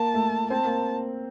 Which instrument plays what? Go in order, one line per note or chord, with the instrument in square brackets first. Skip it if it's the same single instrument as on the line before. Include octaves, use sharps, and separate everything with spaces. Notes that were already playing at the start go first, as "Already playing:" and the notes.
Already playing: [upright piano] A#3 [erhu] A5
[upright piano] A3
[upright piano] C4 [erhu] A5
[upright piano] A#3